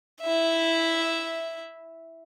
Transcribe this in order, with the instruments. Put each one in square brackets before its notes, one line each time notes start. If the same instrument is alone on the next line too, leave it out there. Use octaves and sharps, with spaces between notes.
[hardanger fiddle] E4 E5